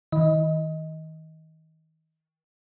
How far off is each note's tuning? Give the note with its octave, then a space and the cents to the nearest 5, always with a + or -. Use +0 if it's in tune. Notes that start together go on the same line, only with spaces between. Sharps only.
D#3 +35 D#5 +15